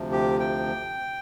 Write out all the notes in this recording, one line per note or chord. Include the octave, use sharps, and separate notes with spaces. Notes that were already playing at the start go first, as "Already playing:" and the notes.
Already playing: D2 C3 F3
G4
G5